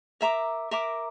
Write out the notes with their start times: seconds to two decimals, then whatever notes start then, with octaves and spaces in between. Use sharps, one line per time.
0.21 A#4 E5 A#5 D6
0.71 A#4 E5 A#5 D6